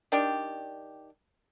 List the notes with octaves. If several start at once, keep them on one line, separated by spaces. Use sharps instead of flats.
D#3 D4 G4